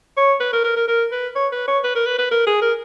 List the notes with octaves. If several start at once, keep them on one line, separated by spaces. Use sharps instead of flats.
C#5
B4
A#4
A#4
A#4
A#4
B4
C#5
B4
C#5
B4
A#4
B4
B4
A#4
G#4
A#4